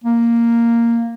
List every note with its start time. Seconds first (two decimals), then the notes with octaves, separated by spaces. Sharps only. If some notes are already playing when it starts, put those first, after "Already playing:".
0.04 A#3